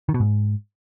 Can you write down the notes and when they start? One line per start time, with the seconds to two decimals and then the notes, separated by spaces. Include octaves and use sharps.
0.09 D#3
0.14 B2
0.20 G#2